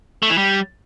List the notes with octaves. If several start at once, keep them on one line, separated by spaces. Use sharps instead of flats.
A3
E3
G3